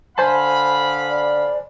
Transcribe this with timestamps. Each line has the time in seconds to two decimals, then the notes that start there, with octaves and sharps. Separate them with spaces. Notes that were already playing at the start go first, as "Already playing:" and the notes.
0.18 D3 C5 F5 G#5 A5 B5
1.09 D5